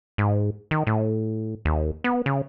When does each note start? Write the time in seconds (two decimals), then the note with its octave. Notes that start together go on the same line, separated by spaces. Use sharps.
0.18 G#2
0.71 D#3
0.87 A2
1.65 D#2
2.04 B3
2.26 C#3